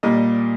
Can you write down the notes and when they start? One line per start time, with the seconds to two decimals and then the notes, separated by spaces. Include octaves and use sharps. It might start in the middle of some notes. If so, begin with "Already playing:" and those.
0.03 A#2 G3 A#3 D#5